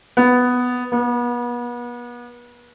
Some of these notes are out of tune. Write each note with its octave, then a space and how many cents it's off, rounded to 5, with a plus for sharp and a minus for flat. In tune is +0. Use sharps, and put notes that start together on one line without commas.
B3 +5
B3 -35